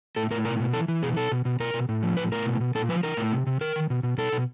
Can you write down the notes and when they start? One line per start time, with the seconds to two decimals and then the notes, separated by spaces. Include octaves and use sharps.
0.16 A2 A4
0.31 A2 A#4
0.45 B2 A#4
0.60 B2
0.74 E3 A4
0.88 E3
1.03 B2 G#4
1.17 B2 A4
1.32 B2
1.45 B2
1.60 B2 A#4
1.74 B2
1.89 A2
2.03 F3
2.17 A2 B4
2.32 A2 A#4
2.46 B2
2.60 B2
2.75 A#2 A4
2.89 F3 B4
3.03 E3 A#4
3.17 A2
3.32 C3
3.47 C3
3.61 D#3 A#4
3.76 D#3
3.90 B2
4.03 B2
4.18 B2 A4
4.32 B2